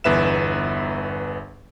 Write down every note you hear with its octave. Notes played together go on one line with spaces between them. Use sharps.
G1 E2 B4 E5 E7